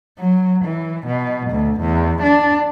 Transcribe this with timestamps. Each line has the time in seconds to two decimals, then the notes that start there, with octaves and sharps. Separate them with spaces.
0.19 F#3
0.64 E3
1.07 B2
1.50 D2
1.80 E2
2.22 D4